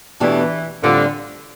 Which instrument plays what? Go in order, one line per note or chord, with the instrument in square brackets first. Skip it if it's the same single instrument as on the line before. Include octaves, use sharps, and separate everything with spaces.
[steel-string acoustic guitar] E2 B2 A3 D4 G4 [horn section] E3
[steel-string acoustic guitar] A2 G3 C4 F4 [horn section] D3